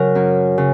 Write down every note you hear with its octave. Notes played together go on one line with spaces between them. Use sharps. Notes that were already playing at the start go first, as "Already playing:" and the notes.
Already playing: C#3 F#3 A#4
F#2
C#3